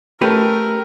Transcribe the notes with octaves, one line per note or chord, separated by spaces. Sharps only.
A3 C#4 G4 A#4 B4